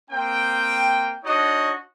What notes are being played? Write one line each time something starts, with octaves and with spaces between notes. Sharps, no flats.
A#3 C4 G5
D4 D#4 F#4 C#5 D#5